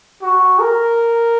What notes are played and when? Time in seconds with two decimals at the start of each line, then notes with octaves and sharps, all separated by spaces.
0.22 F#4
0.60 A#4